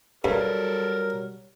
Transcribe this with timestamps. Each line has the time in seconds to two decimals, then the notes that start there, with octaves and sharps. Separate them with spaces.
0.24 G2 F#3 G3 A4 A#4